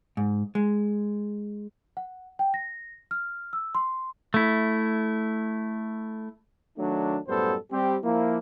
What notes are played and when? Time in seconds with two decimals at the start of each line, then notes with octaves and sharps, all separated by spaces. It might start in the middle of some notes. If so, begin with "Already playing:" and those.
0.17 G#2
0.55 G#3
1.97 F#5
2.39 G5
2.54 A#6
3.11 F6
3.53 E6
3.75 C6
4.34 A3 E4
6.78 D#3 F#3 A3 D4
7.28 F#2 A2 G3 B3 A4 C5
7.71 G3 C4 G4
8.04 F3 A#3 E4